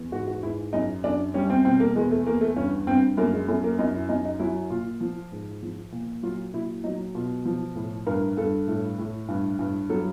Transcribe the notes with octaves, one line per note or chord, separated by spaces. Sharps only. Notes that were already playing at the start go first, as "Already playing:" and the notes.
Already playing: E2
G#2 F#4
F#4
G#2 E4
F#2 D#4
F#2 D4
G3 C#4
C4
B2 C4
A#3
E2 G#3
A3
E2 A#3
A3
G2 C#4
G2 C4
F#2 A#3
G#3
F#2 A3
A#3
F#2 D#4
E4
F#2 D#4
D#4
F#3 E4
A#2 F4
F3
G#2
F3
A#2
F#3 F4
A#2 E4
F#3 D#4
B2 F4
F3
A2
G2 A#4
G2 A4
A2
A2
G2
G2
F#3 A4